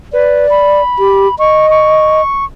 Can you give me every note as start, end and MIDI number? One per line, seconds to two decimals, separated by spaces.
0.13 0.46 71
0.13 0.82 74
0.50 1.35 83
0.99 1.28 67
1.39 2.22 75
1.39 1.69 85
1.70 2.45 85